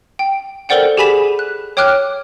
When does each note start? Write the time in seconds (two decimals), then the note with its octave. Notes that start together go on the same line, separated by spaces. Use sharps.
0.19 G5
0.69 A4 A#4 C5 D5 F#5 G5
0.97 G4 G#4 G#5 B5 B6 E7
1.39 F#6
1.77 C#5 G5 D6 F6 F#6